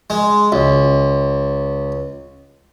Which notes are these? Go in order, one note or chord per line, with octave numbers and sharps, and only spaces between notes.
G#3
C#2